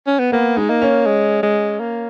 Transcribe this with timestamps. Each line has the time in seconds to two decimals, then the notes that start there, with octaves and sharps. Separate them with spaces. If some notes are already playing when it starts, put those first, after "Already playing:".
0.07 C#4
0.19 B3
0.32 A#3 B3
0.57 G#3 D#4
0.70 A#3
0.82 C#4
1.06 G#3
1.43 G#3
1.80 A#3